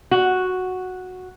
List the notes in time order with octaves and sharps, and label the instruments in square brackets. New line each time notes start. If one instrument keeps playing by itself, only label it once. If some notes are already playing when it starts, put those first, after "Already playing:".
[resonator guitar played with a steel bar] F#4